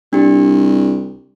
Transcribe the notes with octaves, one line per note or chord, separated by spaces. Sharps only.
C2 D4 G4